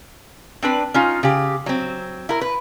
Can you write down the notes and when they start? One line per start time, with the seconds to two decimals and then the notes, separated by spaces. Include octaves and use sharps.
0.62 C4 D4 B4
0.94 C#4 D#4 F4
1.23 C#3 G4
1.66 F#3 C4
2.29 E4 A#4
2.41 B4